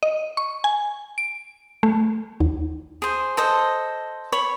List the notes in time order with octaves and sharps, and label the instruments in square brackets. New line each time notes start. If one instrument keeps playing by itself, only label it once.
[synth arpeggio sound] D#5
C#6
G#5
D7
A3
D#2
[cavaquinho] G#4 C5
A4 C5 D#5
C#5 B5